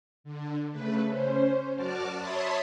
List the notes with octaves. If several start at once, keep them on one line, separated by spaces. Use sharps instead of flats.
D3
C#3 A3 B4
C#4 C5
F#2 F#4 D5 A5 D6 F6
C#5 E5 A5 B5 C6 D#6